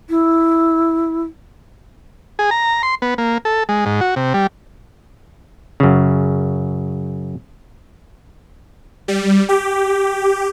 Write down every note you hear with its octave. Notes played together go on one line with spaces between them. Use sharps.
E4
G#4
A#5
C6
B3
A#3
A4
G#3
G#2
F#4
C3
G3
F#2 C#3
G3
G4